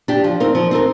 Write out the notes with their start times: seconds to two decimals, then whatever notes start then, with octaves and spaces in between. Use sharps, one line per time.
0.08 D4 G4
0.24 F3
0.40 C4 D#4 A#4
0.55 F3
0.71 C4 D#4 A#4